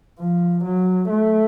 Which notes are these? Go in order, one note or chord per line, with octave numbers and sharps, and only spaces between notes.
F3
F#3
A3